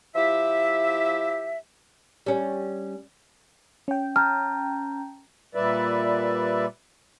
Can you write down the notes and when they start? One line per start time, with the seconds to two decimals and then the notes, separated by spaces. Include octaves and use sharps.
0.16 F3 E4 G4 E5
2.26 G3 C#4
3.88 C#4 G5
4.16 A5 A#5 F6 G6
5.55 A#2 G3 B4 D5 E5